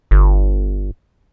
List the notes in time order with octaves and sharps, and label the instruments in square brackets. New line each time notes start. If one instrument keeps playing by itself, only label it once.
[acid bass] G1